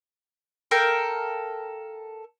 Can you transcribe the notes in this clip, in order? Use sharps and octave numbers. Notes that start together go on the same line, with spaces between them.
A4 A#4 F5 G5